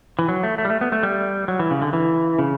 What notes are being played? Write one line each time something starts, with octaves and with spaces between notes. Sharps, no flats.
E3
F#3
A3
A3
G3
A3
B3
A3
G3
F#3
E3
C#3
D3
E3
C#3